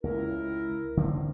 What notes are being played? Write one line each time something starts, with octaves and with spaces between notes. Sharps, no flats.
C#2 E4 A#4
D3 D#3 C4